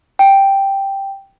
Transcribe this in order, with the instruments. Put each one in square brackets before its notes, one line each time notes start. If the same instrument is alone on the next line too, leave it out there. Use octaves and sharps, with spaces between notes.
[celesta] G5